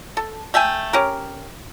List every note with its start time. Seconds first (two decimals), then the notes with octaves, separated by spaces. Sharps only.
0.17 A4
0.54 A3 E5 G5 G#5
0.93 C#4 G4 A#4